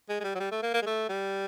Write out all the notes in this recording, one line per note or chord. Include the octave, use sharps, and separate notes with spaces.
G#3
G#3
G3
F#3
G3
A3
A#3
A#3
G#3
A3
G3